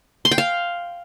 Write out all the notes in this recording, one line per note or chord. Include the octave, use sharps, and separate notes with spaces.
C6
G5
F5